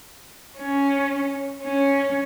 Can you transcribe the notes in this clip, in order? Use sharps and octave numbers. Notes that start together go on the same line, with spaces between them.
C#4
C#4